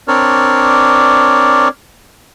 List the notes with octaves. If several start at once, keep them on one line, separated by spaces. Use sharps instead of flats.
C4 D4 A#4 C#5 D5